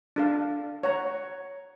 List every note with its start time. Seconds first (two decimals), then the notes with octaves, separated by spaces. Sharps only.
0.16 D4 A4 F5
0.83 C#5 F#5 A#5